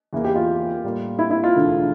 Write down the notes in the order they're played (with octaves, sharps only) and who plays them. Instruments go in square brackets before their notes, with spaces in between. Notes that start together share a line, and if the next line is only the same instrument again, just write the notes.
[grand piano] E2 E3 A#3
[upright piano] G4
F4
[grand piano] A2 G3 A#3
[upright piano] E4
E4
F4
[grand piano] E1 D2 D3 A3